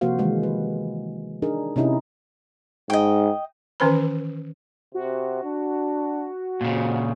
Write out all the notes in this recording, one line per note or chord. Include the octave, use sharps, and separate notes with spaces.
C3 F3 A#3 F#4 C5 F5
D#3 E3 G#3
B4
D4 D#4 G#4 A#4
C3 C#4 D#4 E4
G#2 D#5 G5
D#3 E3 C#4 B4 C5 B5
C3 F#4
D4
F2 A#2 C#3